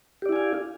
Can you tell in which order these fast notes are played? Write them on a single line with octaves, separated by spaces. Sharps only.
G4 D5 E4 G#5 F5